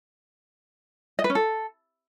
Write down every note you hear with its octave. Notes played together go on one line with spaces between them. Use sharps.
D#5
B4
C#4
A4